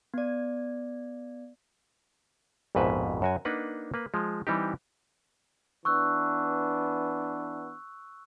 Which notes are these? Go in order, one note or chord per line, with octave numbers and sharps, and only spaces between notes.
B3 D5
A#1 F2 G#2 B2 B4 E5
F#2 F#4 G#5
A#3 D4 D#4 B4 F#5
A#3 B4
F3 G#3
E3 G3 C4 D#4 G4
E3 B3 D4 C#6 E6 F#6